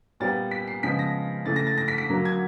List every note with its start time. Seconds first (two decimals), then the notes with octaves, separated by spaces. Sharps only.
0.20 A#2 G3 B3 A6
0.51 B6
0.67 C7
0.83 C#3 F3 G#3 B3 B6
0.99 A#6
1.46 C#3 E3 A3 A6
1.56 A#6
1.67 A6
1.78 A#6
1.88 B6
1.98 B6
2.09 D3 F#3 A#3
2.25 G#6